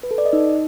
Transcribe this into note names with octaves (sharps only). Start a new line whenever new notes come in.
B4
A4
D5
D#5
D#4